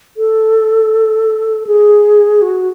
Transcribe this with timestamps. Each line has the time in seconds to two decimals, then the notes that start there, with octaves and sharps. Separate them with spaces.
0.17 A4
1.67 G#4
2.42 F#4